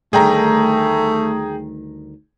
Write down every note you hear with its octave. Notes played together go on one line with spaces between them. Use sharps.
D2 D#3 G3 A3 G#4 G5 A#5